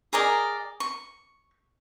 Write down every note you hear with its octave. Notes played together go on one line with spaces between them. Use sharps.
G#4 A#4 D5 D#5
C#6